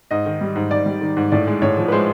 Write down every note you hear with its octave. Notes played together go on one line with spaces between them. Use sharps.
G#2 D#5
D#3
G3
G#2
G#2 D5
G3
D#3
G#2
A2 D5
G#3
A2 C#5
F3
B4
G#3 C5